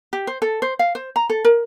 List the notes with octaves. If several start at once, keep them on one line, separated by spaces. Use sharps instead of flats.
G4
C5
A4
C5
F5
C5
A#5
A4
A#4